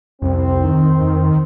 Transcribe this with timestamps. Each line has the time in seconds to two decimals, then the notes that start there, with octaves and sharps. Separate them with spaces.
0.22 C2 F2 C4
0.64 D#3
1.01 F2